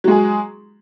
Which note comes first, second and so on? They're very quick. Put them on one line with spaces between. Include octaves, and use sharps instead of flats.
F#3 G#3 G#4